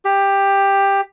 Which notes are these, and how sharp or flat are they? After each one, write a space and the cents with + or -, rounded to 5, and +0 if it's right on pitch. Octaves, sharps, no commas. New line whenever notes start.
G4 +10